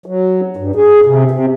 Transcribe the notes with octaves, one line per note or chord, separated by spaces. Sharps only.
F#3
G2
G#4
C3
C3